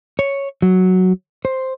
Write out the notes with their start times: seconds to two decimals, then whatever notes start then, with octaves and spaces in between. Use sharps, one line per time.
0.19 C#5
0.62 F#3
1.45 C5